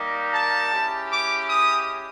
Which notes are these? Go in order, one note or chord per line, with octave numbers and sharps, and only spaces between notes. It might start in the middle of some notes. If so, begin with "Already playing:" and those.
Already playing: G3 A#3 D#4 G4
A5
G#3 C#4 E4 G4
D6
D#6